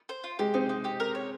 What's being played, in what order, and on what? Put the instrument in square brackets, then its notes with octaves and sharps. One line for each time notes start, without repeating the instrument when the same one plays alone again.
[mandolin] C5
F4
[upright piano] G#3 [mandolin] G4
[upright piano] C4 [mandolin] D#4
[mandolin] D#4
G4
A#4
C#5